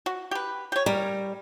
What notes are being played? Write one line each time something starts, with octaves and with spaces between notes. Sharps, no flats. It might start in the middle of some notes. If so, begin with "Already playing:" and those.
F#4
G4 B4
G4 C#5
G3 A#4